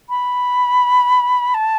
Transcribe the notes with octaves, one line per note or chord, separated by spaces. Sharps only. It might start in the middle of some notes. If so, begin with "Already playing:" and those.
B5
A5